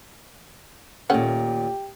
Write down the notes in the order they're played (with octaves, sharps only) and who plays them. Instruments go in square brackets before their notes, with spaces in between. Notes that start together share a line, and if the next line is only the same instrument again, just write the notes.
[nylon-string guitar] D#2 A#2 [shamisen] A3 C#4 F#5 [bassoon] G4